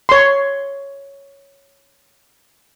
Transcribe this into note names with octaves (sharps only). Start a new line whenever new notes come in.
C#5 C6